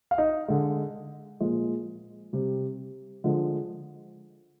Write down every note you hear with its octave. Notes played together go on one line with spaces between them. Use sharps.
F5
D#4 D#5
D3 G#3
A#2 F3 G#3
C3 G3
D3 F3 G#3